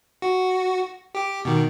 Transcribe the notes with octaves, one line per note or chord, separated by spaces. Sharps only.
F#4
G4 D6
B2 D#3